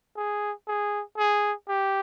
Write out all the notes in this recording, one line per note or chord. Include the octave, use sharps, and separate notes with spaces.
G#4
G#4
G#4
G4